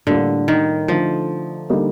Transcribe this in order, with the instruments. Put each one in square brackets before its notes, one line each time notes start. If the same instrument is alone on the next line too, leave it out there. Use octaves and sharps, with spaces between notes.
[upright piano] A2 G3 A#3 F4 [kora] D3
[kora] D#3
[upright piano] D3 A3 D#4 [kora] F3
[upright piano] D3 G3 A#3 D#4